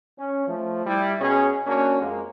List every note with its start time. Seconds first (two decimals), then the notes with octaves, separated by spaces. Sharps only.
0.18 C#4
0.47 F3 A3
0.86 G3 E4
1.20 B2 C#4 G#4
1.66 A#3 C#4 D4 F#4
2.01 F2 G#3 A#3